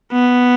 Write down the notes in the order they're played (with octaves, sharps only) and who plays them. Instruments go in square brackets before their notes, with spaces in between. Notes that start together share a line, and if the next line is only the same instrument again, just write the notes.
[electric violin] B3